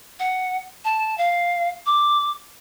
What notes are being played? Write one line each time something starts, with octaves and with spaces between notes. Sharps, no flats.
F#5
A5
F5
D6